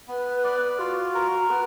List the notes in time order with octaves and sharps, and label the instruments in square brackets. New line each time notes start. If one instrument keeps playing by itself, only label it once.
[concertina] B3 [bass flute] B4
[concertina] D5
[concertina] F4 [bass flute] F#4
[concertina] A#4
[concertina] B3 [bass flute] B4